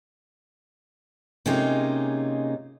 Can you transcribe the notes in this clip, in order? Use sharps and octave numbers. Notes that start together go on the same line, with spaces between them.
C3 G#3 A#3 C#4 D#4 F4